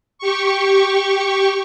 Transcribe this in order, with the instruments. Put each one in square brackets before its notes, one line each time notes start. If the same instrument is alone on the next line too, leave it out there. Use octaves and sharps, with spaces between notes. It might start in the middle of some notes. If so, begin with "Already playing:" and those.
[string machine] G4 C#6